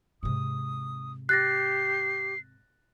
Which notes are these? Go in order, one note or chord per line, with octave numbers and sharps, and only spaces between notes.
G#2 C3 D#6
G4 F#6 A6 A#6 C7